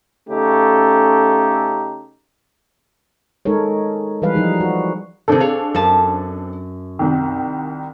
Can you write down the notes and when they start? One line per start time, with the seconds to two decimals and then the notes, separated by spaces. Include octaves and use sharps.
0.29 C#3 A3 C#4 D#4 G4 A4
3.45 G#3 D#4 A4 A#4 C#5
4.22 E3 G3 B4 F5
4.35 F3 G3 D#4 G#4
4.60 F#4
5.28 C3 D#3 C4 D4 A4
5.40 G#4 C#5 F5
5.75 F#2 F5 A5
6.99 C2 D#3